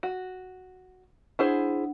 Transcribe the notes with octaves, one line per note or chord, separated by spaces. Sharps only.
F#4
D4 E4 G#4 C5 F#5